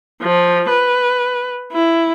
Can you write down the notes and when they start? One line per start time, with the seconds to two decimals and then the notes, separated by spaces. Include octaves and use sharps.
0.23 F3
0.69 B4
1.72 E4